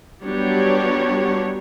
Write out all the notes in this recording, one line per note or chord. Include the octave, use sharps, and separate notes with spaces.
F#3 G3 B3 D4 G4 C#5